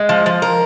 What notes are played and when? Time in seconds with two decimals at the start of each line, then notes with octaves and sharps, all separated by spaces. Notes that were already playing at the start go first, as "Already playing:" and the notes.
Already playing: G#3
0.09 F3
0.26 F3
0.42 A#4